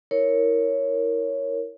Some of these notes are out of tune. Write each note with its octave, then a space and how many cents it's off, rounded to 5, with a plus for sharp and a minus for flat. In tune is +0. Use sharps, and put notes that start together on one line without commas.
E4 -20 A#4 +0 C#5 +0